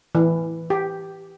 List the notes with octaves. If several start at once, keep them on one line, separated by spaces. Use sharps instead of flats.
E3
G4